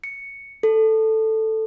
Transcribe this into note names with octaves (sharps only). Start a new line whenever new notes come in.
C#7
A4